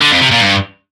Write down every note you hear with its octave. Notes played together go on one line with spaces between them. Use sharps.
D3
F2
C3
A#2
G2